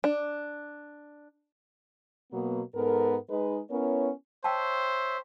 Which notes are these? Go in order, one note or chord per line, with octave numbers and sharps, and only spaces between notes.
D4
B2 F#3 A#3 B3
G#2 B3 A4 A#4
G#3 D#4 B4
B3 C#4 E4 A#4 C#5
C5 C#5 E5 G5 A5